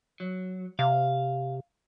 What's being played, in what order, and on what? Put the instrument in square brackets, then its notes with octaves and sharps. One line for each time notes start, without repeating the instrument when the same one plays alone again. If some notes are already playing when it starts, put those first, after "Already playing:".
[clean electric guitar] F#3
[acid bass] C3 [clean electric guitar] F5